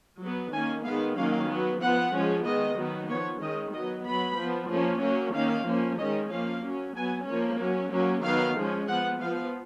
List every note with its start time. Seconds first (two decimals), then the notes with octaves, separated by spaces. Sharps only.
0.21 F#3 B3
0.52 D#3 A#3 C#4 G#5
0.84 D#3 G#3 B3 F5
1.16 D#3 F#3 A#3 C#4 F5
1.49 F#3 B3
1.80 F3 B3 F#5
2.13 F3 G#3 C#4
2.45 D#3 G#3 B3 D#5
2.77 D#3 F#3 B3
3.09 F3 B3 C#5
3.42 D#3 G#3 C#4 D#5
3.73 F#3 B3 D#5
4.07 F#3 B3 B5
4.38 F3 B3
4.70 F3 A#3 C#4
5.02 F#3 A#3 C#4
5.34 D#3 A#3 C#4 F5
5.67 F3 A#3 C#4
5.98 D#3 G#3 C#4 D#5
6.30 F3 A#3 C#4 F5
6.63 F#3 C#4
6.96 F#3 B3 G#5
7.27 F3 A#3 C#4
7.59 F#3 C#4
7.92 F#3 A#3 C#4
8.23 D#3 F#3 B3 F5
8.56 F3 G#3 C#4
8.88 F3 B3 F#5
9.20 F3 B3 F5